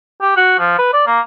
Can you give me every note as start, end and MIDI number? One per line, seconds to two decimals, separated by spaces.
0.22 0.33 67
0.37 0.57 66
0.59 0.76 53
0.78 0.93 71
0.93 1.05 74
1.07 1.20 58